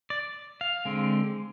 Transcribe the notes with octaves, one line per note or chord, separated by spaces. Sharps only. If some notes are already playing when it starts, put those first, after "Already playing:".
D5
F5
D3 G#3 C4